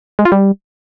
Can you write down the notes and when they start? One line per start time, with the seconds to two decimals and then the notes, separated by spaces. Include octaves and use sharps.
0.19 G#3
0.25 F4
0.32 G3